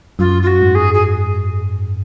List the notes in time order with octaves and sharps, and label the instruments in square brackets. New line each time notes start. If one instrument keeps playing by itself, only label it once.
[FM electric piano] F#2 [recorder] F4
[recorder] F4
F#4
[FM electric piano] G#2
[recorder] G#4
G#4